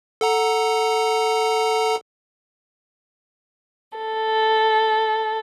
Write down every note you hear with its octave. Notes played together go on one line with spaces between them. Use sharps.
A4 F#5 A#5
A4